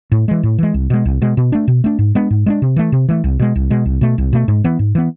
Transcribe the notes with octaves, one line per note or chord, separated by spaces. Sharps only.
A2
E3 G#3
A2
E3 G#3
C2
B2 G#3
C2
B2 G#3
B2
A3 D4
B2
A3 D4
G#2
G#3 B3 D4
G#2
G#3 B3 D4
C3
E3 A3
C3
E3 A3
C2
B2 G#3
C2
B2 G#3
C2
B2 A3
C2
B2 A3
G#2
E3 B3
G#2
E3 B3